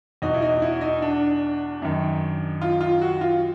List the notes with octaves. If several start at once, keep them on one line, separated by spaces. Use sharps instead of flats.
E2 B2 D#4
E4
D#4
E4
D#4
D4
F#2 D#3
F4
F4
F#4
F4